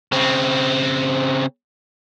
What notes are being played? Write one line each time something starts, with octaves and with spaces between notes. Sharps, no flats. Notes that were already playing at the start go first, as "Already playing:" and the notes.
C#3 C4